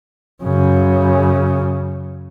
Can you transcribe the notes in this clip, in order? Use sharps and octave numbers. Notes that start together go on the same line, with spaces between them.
F#2 C#3